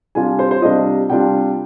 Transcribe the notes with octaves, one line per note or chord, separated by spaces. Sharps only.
C3 G3 D4 F4 G#5
C5
C5
C3 G3 D4 F4 D#5
C3 G3 D4 F4 G5